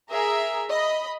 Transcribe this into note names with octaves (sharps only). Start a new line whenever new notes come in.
G#4 A#4 E5 A#5
D#5 B5